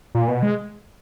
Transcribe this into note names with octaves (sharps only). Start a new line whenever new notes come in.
A#2
B2
G#3